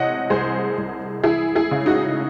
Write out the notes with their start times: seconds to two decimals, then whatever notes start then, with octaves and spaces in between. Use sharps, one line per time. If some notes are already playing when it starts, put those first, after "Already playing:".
Already playing: C3 E3 C#5 D#5 F#5
0.30 C2 G#4 C5
0.78 C2
1.23 E3 E4 G#4
1.55 E4 G#4
1.71 C#3
1.86 D#4 F#4